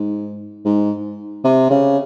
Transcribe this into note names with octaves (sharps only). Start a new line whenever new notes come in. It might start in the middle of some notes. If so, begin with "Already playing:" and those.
Already playing: G#2
G#2
C3
C#3